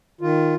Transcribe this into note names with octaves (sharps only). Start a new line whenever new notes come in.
D#3 F4